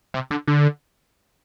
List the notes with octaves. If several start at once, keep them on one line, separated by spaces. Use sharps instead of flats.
C3
D3
D3